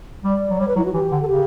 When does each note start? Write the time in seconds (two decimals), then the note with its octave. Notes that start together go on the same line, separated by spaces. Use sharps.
0.24 G3 D5
0.50 F#3
0.59 G3 C#5
0.67 B4
0.76 F#3 E4
0.85 F#4
0.94 E3 G4
1.12 D3
1.22 A4
1.28 C#3 G4